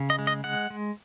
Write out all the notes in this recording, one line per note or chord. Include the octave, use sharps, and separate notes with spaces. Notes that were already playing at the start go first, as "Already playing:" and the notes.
Already playing: C#3
D#5
G#3
D#5
G#3 F#5
G#3